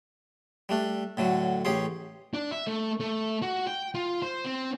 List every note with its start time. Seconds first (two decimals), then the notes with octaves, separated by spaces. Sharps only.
0.69 G3 A3 D4
1.17 A2 D3 F#3
1.65 A1 C#4 G4 G#4 C6
2.34 D4
2.51 E5
2.67 A3
3.00 A3
3.42 F#4
3.67 G5
3.95 F4
4.22 C5
4.45 C4